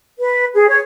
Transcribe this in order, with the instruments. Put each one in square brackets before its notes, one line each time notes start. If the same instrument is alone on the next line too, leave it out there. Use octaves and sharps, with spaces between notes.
[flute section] B4
G#4
C#5